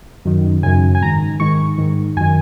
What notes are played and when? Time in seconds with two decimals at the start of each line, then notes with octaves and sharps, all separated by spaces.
0.25 F#2 D#3
0.63 F#2 C#3 G#5
0.95 G#5
1.01 G#2 D#3 A#5
1.40 G#2 D#3 C#6
1.78 G#2 D#3
2.17 F#2 D#3 G#5